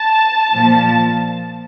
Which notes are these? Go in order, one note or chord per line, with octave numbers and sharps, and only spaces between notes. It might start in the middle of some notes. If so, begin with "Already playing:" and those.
Already playing: A5
A#2 F3